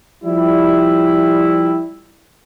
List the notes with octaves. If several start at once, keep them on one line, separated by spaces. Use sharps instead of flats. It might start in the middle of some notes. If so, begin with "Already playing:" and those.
F3 G3 E4